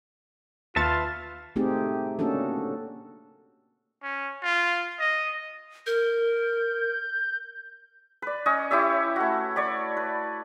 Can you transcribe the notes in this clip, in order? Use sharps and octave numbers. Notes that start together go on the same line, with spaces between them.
D#2 F4 B4 E5 A5 C#6 A6
A3 C4 D#4 G4 G#4
A#3 C#4 D4 F#4 A4
C#4
F4
D#5
A#4 G6
B4 D5
C#4 C#5 D#5
E4 G4 C#5 E5
A3 F#4
C#5 D5 B5
B4